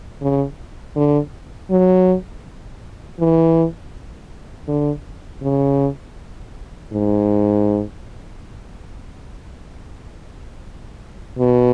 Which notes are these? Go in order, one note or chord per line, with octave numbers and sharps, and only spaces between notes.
C#3
D3
F#3
E3
D3
C#3
G#2
B2